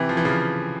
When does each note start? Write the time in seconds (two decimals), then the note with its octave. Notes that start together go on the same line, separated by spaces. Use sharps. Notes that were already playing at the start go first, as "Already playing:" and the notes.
Already playing: C3 E3
0.09 F3
0.17 E3
0.25 C#3 F3